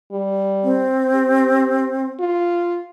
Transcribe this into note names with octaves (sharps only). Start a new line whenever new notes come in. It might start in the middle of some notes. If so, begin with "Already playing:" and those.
G3
C4
G4
F4